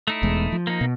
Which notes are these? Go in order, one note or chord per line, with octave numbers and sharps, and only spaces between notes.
A3 D#4 E4
E1 E2 G#3
F3
A#3 D#4
B2